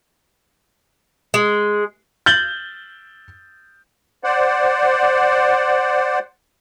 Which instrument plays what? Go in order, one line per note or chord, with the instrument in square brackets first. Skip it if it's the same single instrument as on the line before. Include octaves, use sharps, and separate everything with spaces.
[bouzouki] G#3
[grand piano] G6 A6 F#7 G7
[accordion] C5 D5 F#5